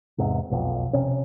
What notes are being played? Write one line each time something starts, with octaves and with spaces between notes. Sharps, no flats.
E2 G#2 C3
E1 B1 F2
C3 C#4